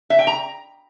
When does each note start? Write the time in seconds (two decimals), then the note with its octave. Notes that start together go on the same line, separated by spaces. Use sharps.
0.10 E5
0.19 G5
0.27 A#5